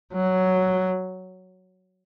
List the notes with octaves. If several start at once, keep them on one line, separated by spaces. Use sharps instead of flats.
F#3